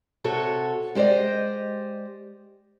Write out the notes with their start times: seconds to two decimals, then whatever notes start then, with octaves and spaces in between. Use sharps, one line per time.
0.24 C3 F#4 A4 C#5
0.95 G#3 G4 C5 D5 D#5